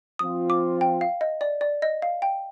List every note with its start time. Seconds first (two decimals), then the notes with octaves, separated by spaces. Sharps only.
0.19 F3 C4 F4 D#6
0.50 D6
0.81 G5
1.01 F5
1.21 D#5
1.41 D5
1.61 D5
1.82 D#5
2.02 F5
2.22 G5